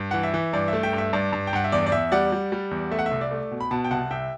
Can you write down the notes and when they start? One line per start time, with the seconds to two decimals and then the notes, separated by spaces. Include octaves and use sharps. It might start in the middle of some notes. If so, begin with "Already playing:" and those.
Already playing: G2
0.11 E3 F#5
0.23 E5
0.34 E3
0.53 G2 D5
0.68 A3 E5
0.83 E5 G5
0.93 G2
0.98 E5
1.13 G2 D5
1.33 G2
1.47 G5
1.53 G2 F#5
1.64 E5
1.72 E2 D5
1.86 D5
1.92 E2 E5
2.12 G3 D5 F#5
2.32 G3
2.52 G3
2.71 E2
2.91 A3 E5
2.99 F#5
3.06 E5
3.11 C2
3.21 D5
3.31 A3
3.51 B2
3.61 B5
3.71 B2 F#5 A5
3.84 G5
3.91 C2 F#5 A5
4.11 C2 E5 G5